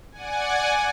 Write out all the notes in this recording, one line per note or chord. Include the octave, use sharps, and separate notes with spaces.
D5 F#5 G#5